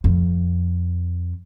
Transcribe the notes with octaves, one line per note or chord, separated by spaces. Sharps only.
F2